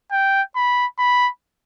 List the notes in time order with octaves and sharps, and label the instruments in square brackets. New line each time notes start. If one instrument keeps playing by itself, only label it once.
[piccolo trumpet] G5
B5
B5